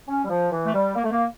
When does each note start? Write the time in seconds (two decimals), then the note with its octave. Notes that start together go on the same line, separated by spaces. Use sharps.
0.08 C#4
0.25 G3
0.29 F3
0.52 E3
0.66 A3
0.74 G3
0.95 A#3
1.04 A3
1.11 A#3